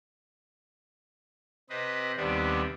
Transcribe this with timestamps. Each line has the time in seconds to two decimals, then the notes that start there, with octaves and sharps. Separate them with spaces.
1.70 C3 C4 B4 D#5
2.17 D#2 C3 G3 B3 D4